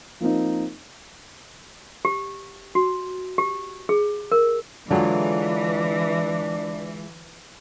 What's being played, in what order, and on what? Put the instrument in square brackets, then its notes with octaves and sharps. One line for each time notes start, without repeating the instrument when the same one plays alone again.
[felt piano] F3 A#3 C4 D#4
[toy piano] G4
F#4
G4
G#4
A#4
[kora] D3 F#3 G#4 [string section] E3 [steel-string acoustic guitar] G#3 F4 [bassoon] D4